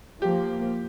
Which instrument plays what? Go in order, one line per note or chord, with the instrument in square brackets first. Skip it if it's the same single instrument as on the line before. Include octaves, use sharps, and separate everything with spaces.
[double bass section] F3 A#3 [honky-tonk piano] G4